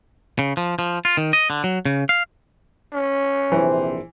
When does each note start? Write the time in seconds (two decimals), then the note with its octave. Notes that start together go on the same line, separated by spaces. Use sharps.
0.39 C#3
0.57 F3
0.79 F3
1.05 F4
1.17 D#3
1.33 D#5
1.50 D3
1.64 F#3
1.85 C#3
2.09 F5
2.93 C#4
3.52 A#1 C3 E3 C5